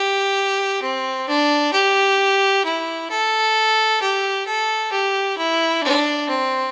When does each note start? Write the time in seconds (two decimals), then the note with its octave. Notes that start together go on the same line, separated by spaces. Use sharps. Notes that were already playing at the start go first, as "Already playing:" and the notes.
Already playing: G4
0.82 C4
1.28 D4
1.73 G4
2.65 E4
3.10 A4
4.02 G4
4.47 A4
4.92 G4
5.37 E4
5.83 D4
6.29 C4